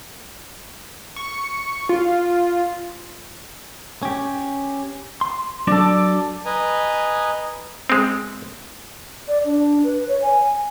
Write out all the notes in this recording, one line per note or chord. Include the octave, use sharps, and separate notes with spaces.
C#6
F4
C#4 G4
C6
F#3 D4 F#4 A4 D5
B4 D#5 G#5 A#5
G#3 C4
D5
D4
B4
C#5
G#5